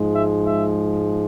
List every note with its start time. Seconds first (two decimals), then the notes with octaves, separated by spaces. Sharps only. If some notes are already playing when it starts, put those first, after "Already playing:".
Already playing: G#2 F3 G#3
0.12 E5
0.44 E5